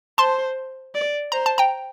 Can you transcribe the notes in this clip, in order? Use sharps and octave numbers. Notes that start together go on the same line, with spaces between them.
C5 A5 C6
D5
C5 A#5
A5
G5 A#5